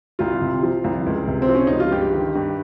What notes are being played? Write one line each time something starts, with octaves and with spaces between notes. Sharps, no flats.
C2 F4
C3
F3
C2
C#2
C3
C4
F3
C#4
C#2 D#4
F4
G2 G4
D#3
G2